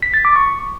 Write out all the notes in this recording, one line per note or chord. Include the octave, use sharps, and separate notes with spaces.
B6
A6
D6
C#6